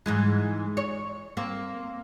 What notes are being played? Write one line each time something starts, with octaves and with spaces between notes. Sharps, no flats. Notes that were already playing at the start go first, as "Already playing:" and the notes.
G#2 E3 G#3
C#5
A#3 C4